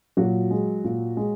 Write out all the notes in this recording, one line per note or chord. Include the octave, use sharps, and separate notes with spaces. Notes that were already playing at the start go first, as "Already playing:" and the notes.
A#2 F#3 F#4
G#3
A#2
G#3